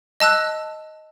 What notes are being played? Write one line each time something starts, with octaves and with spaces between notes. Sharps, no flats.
D#5 A5 E6 F#6